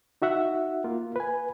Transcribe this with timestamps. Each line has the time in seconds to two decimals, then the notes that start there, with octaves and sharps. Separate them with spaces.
0.22 D#4 F#4 E5 F#5
0.84 A#3 F4
1.16 B4 G#5